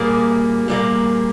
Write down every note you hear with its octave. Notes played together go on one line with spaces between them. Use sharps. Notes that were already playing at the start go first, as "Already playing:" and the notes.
Already playing: A#2 G3 A#3 G#4
A#2 G3 A#3